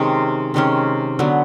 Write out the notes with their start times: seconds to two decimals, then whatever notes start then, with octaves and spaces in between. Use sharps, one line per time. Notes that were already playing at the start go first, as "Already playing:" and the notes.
Already playing: C3 D#3 G#3 C#4
0.54 C3 D#3 G#3 C#4
1.19 D3 F#3 B3